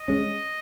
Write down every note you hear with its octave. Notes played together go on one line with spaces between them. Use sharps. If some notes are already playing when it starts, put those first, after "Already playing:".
Already playing: D#5
G#3 C#4